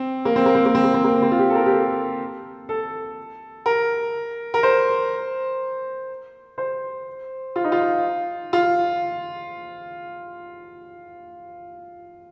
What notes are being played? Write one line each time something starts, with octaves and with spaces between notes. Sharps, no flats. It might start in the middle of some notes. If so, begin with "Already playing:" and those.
Already playing: C4
A#3
C4
A#3
C4
A#3
C4
A#3
C4
A#3
C4
F4
G4
A4
A#4
G4
A4
A4
A#4
A#4
C5
C5
F4
D#4
F4
F4